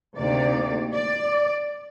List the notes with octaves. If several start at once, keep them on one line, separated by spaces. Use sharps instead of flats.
D2 C3 D#3 A#3 D5
D5